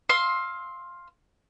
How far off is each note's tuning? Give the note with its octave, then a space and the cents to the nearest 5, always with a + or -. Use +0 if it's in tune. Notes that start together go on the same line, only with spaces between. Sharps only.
F5 +0 C6 +15 E6 -25